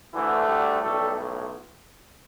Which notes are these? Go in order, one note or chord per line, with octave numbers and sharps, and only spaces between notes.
D2 D3 E3 A3 E4
G3 G4
B1 A2 G3 A3 A4